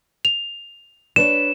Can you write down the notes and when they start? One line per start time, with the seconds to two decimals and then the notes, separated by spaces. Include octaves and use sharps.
0.25 F7
1.16 D4 B4 C#5 E7